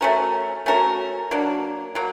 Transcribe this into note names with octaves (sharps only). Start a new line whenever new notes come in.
A3 C#4 F#4 A#4
A3 C#4 F#4 A#4
F#3 A#3 D4
F#3 A#3